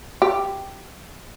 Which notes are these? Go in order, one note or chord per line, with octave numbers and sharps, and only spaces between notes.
G4